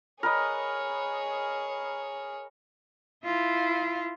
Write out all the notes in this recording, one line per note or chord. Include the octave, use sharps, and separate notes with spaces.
G#4 A#4 B4 C#5 D#5
E4 F4